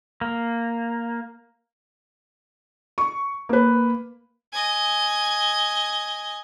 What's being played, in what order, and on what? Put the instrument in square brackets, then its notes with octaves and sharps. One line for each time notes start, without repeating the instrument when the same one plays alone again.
[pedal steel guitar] A#3
[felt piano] C#6
A#3 B4
[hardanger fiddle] D#5 G#5